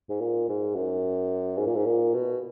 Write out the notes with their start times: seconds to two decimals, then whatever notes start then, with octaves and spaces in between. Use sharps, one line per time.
0.09 G#2
0.21 A#2
0.49 G#2
0.75 F#2
1.58 G#2
1.67 A#2
1.76 G#2
1.86 A#2
2.14 B2